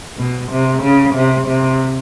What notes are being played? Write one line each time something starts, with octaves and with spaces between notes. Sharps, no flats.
B2
C3
C#3
C3
C3